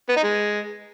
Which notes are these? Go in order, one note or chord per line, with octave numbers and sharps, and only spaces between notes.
B3
D#4
G#3